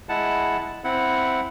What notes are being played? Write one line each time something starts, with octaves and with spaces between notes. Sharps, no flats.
G#3 E4 F#5 A5
C4 E4 F#5